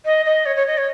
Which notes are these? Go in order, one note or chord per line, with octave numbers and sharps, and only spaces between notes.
D#5
D#5
C#5
C#5
D#5
C#5